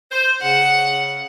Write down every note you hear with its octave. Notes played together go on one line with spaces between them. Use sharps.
C5
C#3 F#5